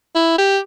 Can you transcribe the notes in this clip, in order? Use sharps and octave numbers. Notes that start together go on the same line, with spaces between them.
E4
G4